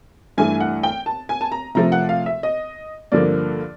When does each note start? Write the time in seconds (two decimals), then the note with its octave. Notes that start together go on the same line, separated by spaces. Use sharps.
0.38 G2 E3 A3 G#5
0.60 F#5
0.83 G5
1.06 A5
1.29 G#5
1.41 A5
1.52 A#5
1.75 C3 F3 A3 A#5
1.92 F#5
2.09 F5
2.26 E5
2.43 D#5
3.12 G2 D3 F3 A#3 D5